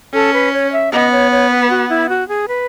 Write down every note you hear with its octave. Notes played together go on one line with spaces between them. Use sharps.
C#4 A4
B4
C#5
E5
B3 D#5
C#5
C#5
B4
F#4
E4
F#4
G#4
B4